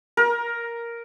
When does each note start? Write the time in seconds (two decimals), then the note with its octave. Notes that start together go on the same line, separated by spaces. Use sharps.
0.17 A#4